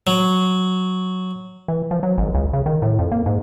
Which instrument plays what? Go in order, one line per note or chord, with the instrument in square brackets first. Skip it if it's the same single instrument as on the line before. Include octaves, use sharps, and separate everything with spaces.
[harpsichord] F#3
[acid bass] E3
F3
F#3
G#1
C#2
C#3
D#3
A2
F2
A#3
G#2